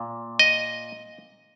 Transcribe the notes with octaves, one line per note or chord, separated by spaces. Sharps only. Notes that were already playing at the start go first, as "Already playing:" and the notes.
Already playing: A#2
D#5